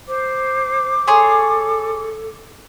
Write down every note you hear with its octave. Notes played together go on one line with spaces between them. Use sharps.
C5 D6
G#4 A4 C#5 C6